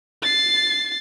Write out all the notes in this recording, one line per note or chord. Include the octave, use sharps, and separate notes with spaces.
A6 C7